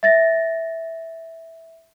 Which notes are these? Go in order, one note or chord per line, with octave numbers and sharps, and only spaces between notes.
E5 A6 A#6